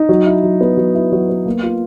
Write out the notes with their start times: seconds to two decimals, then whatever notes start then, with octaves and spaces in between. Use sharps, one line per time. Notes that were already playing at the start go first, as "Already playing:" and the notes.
Already playing: D#4
0.09 F#3
0.26 E4
0.43 F#3
0.61 B3
0.77 F#3
0.95 E4
1.12 F#3
1.29 B3
1.46 A#3
1.63 F4